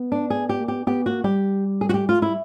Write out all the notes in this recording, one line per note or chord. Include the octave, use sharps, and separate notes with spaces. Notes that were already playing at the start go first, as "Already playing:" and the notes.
Already playing: B3
D4
G#4
G4
A#3
B3 G4
B3 G4
A#3 F#4
G3 G4
G#4
F#4
G4
A3 F4
G#3 E4
G3